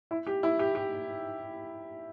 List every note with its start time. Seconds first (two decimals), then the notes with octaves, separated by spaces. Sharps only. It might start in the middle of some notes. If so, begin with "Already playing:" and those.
0.11 E4
0.27 G4
0.43 E4
0.59 G4
0.75 G4